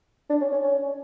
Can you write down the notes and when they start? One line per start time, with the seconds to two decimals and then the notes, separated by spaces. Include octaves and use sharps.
0.30 D4
0.41 C#4
0.52 C#4
0.63 C#4